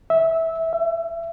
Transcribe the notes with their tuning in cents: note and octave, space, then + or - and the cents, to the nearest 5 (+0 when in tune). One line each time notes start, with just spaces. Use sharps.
E5 -15
E5 +30